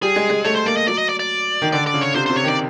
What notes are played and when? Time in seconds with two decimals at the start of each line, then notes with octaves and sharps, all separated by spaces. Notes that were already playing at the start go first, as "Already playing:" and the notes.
0.02 G3 G#4
0.16 G#3
0.30 G#3
0.45 A3 C#5
0.55 C5
0.66 A#3 D5
0.76 D#5
0.87 F#3 D5
0.98 D#5
1.09 D5
1.19 D5
1.62 D#3
1.72 D3 D5
1.87 D5
1.94 C#3
2.01 C#5
2.15 C3 C5
2.26 C3 C5
2.37 C#5
2.44 D#3 D5